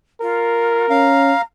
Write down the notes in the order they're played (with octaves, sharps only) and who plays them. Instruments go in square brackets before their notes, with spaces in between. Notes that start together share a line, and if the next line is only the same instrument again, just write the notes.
[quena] F4 [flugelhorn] A#4
[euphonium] C#4 [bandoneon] F5 [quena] A#5